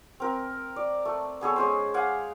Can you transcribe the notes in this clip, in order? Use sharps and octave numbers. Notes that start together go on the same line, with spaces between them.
C4 A#4
D5
A3
B3 G#4 A4 C#5
G#3 C#4 C5
F5 F#5 G#5 D6